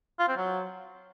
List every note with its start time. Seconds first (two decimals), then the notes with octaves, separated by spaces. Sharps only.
0.19 F4
0.28 C4
0.37 F#3